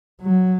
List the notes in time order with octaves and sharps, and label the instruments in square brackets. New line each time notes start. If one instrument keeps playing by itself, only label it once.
[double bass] F#3